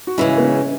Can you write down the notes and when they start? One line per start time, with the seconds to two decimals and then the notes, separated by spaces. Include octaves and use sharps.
0.07 F#4
0.18 C#3 E3 G#3 C#4 E4
0.38 B3
0.44 C#4